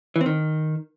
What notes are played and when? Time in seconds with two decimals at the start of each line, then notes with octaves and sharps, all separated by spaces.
0.16 E3
0.21 C4
0.26 D#3